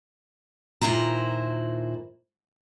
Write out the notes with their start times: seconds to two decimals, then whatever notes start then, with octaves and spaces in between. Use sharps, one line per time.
0.81 D#2 A#2 E4 C5 A#5